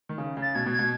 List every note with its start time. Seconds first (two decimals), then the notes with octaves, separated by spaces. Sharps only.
0.09 D#3
0.18 C#3
0.37 C#3
0.42 A6
0.55 B2 G#6
0.66 B2
0.72 G#6
0.79 B2